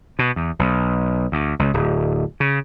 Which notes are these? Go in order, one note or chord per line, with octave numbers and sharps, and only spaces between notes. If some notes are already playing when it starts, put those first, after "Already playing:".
B2
E2
B1
D2
C#2
D1
C#3